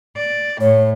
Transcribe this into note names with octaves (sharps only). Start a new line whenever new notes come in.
D5
A2 C#5